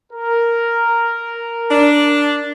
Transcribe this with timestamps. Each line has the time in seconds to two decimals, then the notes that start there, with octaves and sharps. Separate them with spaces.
0.13 A#4
1.70 D4